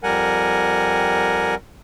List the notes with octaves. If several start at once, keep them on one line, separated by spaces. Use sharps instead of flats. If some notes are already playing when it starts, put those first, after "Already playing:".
F2 G3 A#4 F#5 G#5